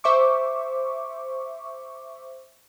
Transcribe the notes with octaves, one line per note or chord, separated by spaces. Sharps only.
C5 E5 C#6 D6